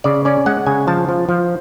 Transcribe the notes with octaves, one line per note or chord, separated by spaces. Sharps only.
C#3 D5
C#4 D5
G#3 F#5
C#3 G#5
F3 A5
F3
F3